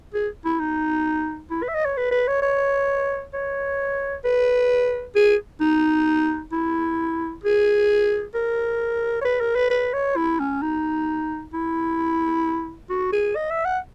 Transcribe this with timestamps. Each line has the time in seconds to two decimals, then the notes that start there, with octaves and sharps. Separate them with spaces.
0.14 G#4
0.45 E4
0.60 D#4
1.51 E4
1.63 B4
1.69 E5
1.75 D#5
1.86 C#5
1.97 B4
2.11 B4
2.28 C#5
2.42 C#5
3.34 C#5
4.25 B4
5.16 G#4
5.61 D#4
6.52 E4
7.44 G#4
8.35 A#4
9.21 C#5
9.25 B4
9.41 A#4
9.56 B4
9.70 B4
9.93 C#5
10.17 E4
10.40 C#4
10.62 D#4
11.54 E4
12.90 F#4
13.12 G#4
13.36 D#5
13.51 E5
13.65 F#5